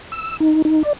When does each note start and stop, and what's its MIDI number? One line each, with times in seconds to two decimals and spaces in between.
0.12 0.37 88
0.40 0.62 63
0.65 0.83 63
0.83 0.93 74